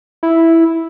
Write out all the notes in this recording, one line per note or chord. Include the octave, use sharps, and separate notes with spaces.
E4